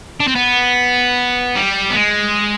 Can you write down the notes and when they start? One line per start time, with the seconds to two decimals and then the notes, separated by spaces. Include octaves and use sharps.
0.20 D4
0.28 C4
0.35 B3
1.55 G3
1.90 B3
1.95 G#3